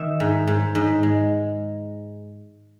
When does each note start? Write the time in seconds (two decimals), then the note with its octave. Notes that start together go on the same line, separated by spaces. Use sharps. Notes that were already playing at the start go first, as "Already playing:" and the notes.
Already playing: D#3 E5
0.20 G#2
0.47 G#2
0.75 G#2
1.03 G#3